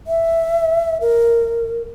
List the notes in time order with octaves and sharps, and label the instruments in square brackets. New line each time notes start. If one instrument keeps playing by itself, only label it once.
[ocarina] E5
A#4